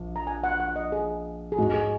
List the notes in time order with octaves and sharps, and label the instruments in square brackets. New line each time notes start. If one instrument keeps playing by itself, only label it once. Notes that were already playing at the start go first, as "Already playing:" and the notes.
Already playing: [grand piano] A#1
[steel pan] A#5
G#5
F#5
F#5
D#5
G#4
G#4
[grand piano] G#2 G#3 D#4 [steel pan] F#4
[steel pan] G#4